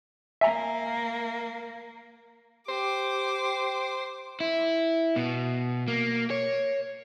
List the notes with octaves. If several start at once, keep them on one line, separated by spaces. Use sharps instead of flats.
A#3 E5 G#5 A#5
G4 C5 D6
E4
B2
A#3
C#5